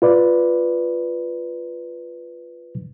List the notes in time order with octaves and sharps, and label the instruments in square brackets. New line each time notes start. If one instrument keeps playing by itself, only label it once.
[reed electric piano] F4 B4 D5